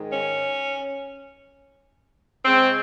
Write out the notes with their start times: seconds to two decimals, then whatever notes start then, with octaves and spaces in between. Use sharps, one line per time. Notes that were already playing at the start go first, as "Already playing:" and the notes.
Already playing: G#2 D#3 G#3
0.13 C#4
2.45 C#3 G#3 C4